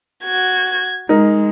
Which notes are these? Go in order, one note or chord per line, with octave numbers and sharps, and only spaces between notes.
F#4 G#6
G#3 D#4 A#4